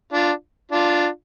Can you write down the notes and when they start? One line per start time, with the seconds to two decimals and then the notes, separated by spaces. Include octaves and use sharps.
0.13 D4 F4
0.71 D4 F4